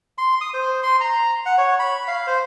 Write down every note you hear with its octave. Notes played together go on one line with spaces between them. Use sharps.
C6
D#6
C5
C6
A#5
F#5
C#5
B5
F5
C5